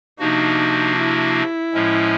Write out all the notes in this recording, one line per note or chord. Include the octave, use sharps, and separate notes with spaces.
C3 F3 A#3 D4 D#4 F#4
E4
A2 F3 G#3 C#4